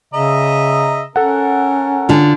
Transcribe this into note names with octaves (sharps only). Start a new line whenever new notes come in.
C#3 D#5 E5 A#5
C#4 A4 A#4 F#5
D3 F4